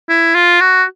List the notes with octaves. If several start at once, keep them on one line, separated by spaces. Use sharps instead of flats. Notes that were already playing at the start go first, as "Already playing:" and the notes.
E4
F4
F#4